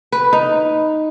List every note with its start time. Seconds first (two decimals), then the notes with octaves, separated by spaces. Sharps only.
0.12 B4
0.33 D#4